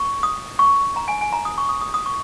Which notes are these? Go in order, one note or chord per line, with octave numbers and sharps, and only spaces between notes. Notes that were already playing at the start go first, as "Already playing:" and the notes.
Already playing: C#6
D#6
C#6
A#5
G#5
G#5
A#5
D#6
C#6
D#6
D#6
D#6
C#6